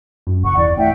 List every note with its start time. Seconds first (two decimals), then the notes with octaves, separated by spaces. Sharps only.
0.27 F#2
0.44 F#1 F#5 C#6
0.57 E2 D5
0.78 A2 E5 F#5 G5